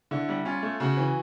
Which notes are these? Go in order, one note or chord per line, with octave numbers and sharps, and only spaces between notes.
D3 E4
G3
C#4 F4
A3
C#3 F#4
E3